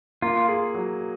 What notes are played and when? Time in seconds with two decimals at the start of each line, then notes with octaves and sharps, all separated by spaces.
0.22 A#3 F4
0.48 G#4
0.75 F#3